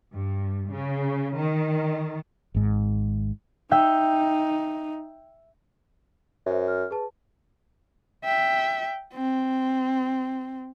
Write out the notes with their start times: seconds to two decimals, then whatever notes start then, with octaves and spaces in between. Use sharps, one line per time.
0.14 G2
0.72 C#3
1.37 D#3
2.55 G#1 G#2
3.71 D#4 E5 G5 G6
6.46 F#2 C5 E5
6.68 F6
6.91 G#4 B4 A5
8.25 E5 G5
9.14 C4